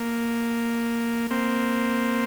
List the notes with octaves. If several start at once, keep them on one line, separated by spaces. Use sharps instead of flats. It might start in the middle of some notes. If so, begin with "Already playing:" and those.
Already playing: A#3
A#3 C4